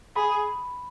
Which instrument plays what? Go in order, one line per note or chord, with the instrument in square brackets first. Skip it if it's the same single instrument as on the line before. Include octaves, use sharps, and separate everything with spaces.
[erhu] G#4 [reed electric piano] B5